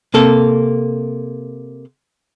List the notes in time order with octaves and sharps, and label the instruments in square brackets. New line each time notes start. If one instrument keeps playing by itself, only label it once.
[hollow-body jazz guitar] C3 A#3 A4